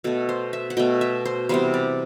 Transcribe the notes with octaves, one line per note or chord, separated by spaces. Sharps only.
B2 A3 A4
C5
E5
F#5
B2 A3 G5
E5
C5
C3 E3 G3 B3 C5
D5